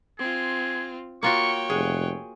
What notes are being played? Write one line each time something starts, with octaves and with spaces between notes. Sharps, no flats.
C4 F4 G#4
A#3 F4 F#4 C#5 G5 C#6
F1 G#4 F#5